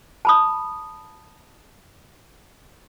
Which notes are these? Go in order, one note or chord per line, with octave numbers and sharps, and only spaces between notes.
A5 B5 D#6